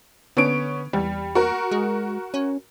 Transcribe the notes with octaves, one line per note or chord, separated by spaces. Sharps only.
D3 B3 C#4 D7
E2 G3
F#4 A#4
G#3
C#4